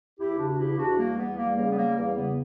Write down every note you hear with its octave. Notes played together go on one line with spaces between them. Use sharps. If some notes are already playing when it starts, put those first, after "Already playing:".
E2 E4 G4
C#3 D4 F#4
E2 E4 G4
E2 D4 F#4
G3 A#3
E2 B3
G3 A#3
C#3 A#3
B3
G3 A#3
E2 A#3
C#3 B3